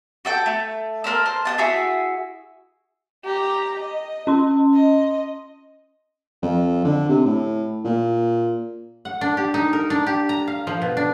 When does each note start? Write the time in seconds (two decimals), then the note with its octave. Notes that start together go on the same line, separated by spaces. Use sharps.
0.25 F#4 A4 G5
0.46 A3
1.04 A4 A#4 C5 E6
1.26 C5
1.45 D#5 F#5 A5
1.58 E4 F#4 G#4 E5
3.25 G4 A#5
3.80 D#5
4.27 C#4 C6
4.74 D#5
6.42 F2
6.84 D3
7.09 C3
7.26 A2
7.84 A#2
9.05 F#5
9.21 D4
9.37 G4
9.54 D#4
9.73 A#4
9.90 D4
10.07 G4
10.29 A#5
10.47 F5
10.67 F3
10.82 B2
10.97 D4